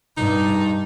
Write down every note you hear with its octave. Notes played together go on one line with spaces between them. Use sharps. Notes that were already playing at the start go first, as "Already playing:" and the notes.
G2 D#4